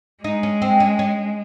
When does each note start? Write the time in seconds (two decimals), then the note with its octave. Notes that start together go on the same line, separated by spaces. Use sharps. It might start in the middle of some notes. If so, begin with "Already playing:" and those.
0.23 G#3 D#4
0.43 C#4
0.62 C4
0.80 C#4
0.99 C#4